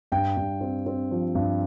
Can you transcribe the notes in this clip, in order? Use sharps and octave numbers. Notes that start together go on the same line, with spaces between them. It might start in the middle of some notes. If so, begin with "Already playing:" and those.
G2 G5
G2
C4
C4
F3
G2